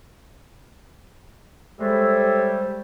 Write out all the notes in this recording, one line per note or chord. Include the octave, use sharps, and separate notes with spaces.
G3 G#3 A4 C5 C#5 E5 B5